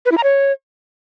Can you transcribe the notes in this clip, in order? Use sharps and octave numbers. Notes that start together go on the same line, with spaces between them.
B4
E4
A#5
C#5